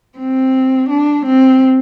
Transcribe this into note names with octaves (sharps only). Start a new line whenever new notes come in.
C4
D4
C4